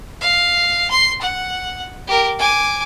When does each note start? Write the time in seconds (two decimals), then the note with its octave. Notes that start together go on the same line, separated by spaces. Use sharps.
0.21 F5
0.90 C6
1.21 F#5
2.07 G4 A#4
2.39 G#5 D6